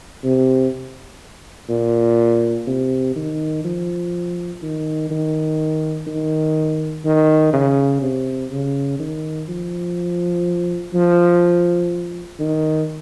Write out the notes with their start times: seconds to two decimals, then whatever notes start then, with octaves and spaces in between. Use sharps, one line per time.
0.24 C3
1.69 A#2
2.67 C3
3.16 D#3
3.64 F3
4.62 D#3
5.10 D#3
6.07 D#3
7.05 D#3
7.53 C#3
8.01 C3
8.50 C#3
8.99 D#3
9.48 F3
10.94 F3
12.39 D#3